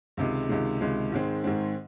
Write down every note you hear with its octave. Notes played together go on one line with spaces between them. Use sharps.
C#2 C3 D#3 G#3
C#2 C3 D#3 G#3
C#2 C3 D#3 G#3
G#2 D#3 G#3 C4
G#2 D#3 G#3 C4